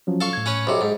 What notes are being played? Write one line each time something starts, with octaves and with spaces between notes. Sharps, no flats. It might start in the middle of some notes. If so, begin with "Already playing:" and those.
F3 F#3 C#4
A4 F5 C#6
A2 G#6
C#4 B4 C#5
B1 C3 C5
G#2